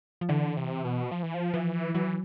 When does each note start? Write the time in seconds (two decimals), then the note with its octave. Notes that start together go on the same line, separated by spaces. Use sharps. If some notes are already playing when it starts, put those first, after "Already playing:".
0.21 F3
0.29 D3 E3
0.57 C3
0.84 B2
1.11 F3
1.23 E3
1.34 F3
1.53 E3 F3
1.94 E3 F#3